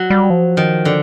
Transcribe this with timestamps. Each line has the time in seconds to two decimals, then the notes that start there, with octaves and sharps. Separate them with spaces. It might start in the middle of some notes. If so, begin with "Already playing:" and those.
Already playing: F#3
0.10 G3
0.30 F3
0.57 D#3
0.85 D3